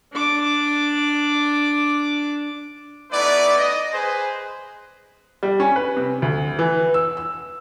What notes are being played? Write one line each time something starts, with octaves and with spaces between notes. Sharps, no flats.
D4 D6
A3 B3 D#4 E4 B4 D5
D#5
G#4 B4 C5
G3
C#4
B4
C3
D2
E3
E6
E6